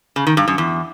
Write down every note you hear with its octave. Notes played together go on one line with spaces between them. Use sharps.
C#3
D#3
G2
F#2
E2